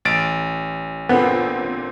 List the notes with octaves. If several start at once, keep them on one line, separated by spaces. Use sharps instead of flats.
A1 A6 D7
A#2 D3 B3 C4